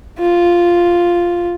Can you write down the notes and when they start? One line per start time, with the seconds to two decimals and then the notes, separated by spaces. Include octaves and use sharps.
0.19 F4